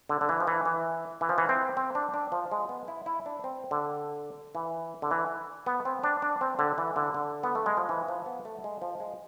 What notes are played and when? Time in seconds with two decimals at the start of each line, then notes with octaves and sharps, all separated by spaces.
0.09 D3
0.21 D3
0.29 E3
0.40 F3
0.47 E3
0.65 E3
1.21 E3
1.29 F3
1.38 E3
1.49 C4
1.77 C4
1.95 D4
2.14 D4
2.32 F3
2.52 G#3
2.69 B3
2.88 E4
3.06 E4
3.26 D4
3.44 C4
3.71 D3
4.55 E3
5.02 D3
5.11 E3
5.66 B3
5.85 C4
6.04 D4
6.22 D4
6.41 C4
6.59 D3
6.78 E3
6.96 D3
7.14 D3
7.43 B3
7.55 A3
7.66 G#3
7.77 F3
7.89 E3
8.08 F3
8.26 B3
8.45 A3
8.64 G#3
8.82 F3
9.00 G#3